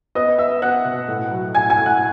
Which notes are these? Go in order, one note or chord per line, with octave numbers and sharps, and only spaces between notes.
B3 D#5 D#6
B3 E5 E6
B3 F#5 F#6
B2
A2
F#3
A2 G#5 G#6
G#5 G#6
A2
F#5 F#6